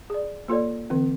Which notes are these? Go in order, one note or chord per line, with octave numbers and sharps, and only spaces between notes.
G#4 D5
A#3 F4 A4 C#5 D5
D3 E3 C4